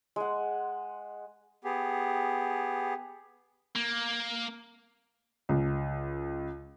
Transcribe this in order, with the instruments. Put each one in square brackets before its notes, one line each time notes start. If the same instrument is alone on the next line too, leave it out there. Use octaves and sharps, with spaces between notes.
[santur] G#3 F#5
[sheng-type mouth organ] B3 G4 G#4
[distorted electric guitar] A#3
[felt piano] C#2